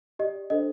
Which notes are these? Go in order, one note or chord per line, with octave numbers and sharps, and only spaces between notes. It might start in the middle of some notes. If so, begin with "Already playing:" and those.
G4 D5 D#5
D4 A4 C5 D#5